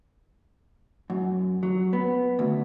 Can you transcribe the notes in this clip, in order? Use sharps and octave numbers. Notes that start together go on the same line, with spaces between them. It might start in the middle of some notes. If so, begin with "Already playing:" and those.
F#2
F#3
B3
D2